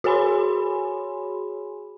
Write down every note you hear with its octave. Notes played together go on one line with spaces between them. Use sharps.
F#4 G#4 C#5 G#5 B5 C6